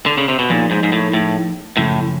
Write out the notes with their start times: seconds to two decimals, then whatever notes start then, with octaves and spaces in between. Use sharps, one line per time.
0.06 D3
0.18 C#3
0.28 C3
0.39 B2
0.50 A#2 F3 A#3 D#4 G#4 C#5
0.71 G#2
0.83 G#2
0.92 A2
1.13 A2
1.77 F#2 A2 C#3 F3 G#3 C#4